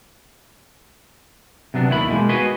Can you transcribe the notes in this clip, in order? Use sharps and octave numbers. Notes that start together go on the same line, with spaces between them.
C3 F#3 B3 D4
D#2 D#3 E4 B5
B2 D#3 F3 G#3 A#3
F#4 G#4 B4 D#5